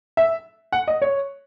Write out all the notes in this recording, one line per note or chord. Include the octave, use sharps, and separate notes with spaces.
E5
F#5
D#5
C#5